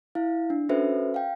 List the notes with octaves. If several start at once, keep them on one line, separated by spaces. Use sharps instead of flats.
E4 F5
D4
C#4 F#4 A4 B4 C5 E5
F5 G5